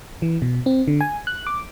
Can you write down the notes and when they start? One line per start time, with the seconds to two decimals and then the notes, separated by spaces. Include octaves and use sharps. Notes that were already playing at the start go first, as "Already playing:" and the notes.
0.22 E3
0.42 B2
0.66 C4
0.88 D3
1.01 G#5
1.27 F#6
1.47 D6